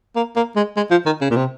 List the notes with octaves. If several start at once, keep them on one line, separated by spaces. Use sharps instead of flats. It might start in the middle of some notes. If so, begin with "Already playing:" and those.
A#3
A#3
G#3
G#3
F3
D#3
C#3
A#2
C3